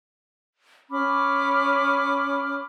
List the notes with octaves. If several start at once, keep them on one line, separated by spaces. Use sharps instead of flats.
C#4 B5 D6 F6